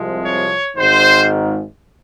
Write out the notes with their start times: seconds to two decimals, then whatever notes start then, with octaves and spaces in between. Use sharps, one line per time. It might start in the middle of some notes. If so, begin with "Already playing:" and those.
Already playing: C2 C3 F3 G#3
0.24 C#5
0.77 G#1 G#2 D#3 C5